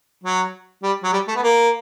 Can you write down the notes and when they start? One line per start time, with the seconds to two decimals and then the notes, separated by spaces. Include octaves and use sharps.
0.23 F#3
0.83 G3
1.03 F#3
1.13 G3
1.28 A3
1.36 B3
1.43 A#3